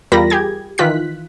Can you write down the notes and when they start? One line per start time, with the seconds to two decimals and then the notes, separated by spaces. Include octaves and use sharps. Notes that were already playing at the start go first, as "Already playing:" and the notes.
0.12 E2 G3 F4 A#4 B5 A#6
0.30 G4 G#4 G#6
0.78 D#3 E3 F4 F#6 B6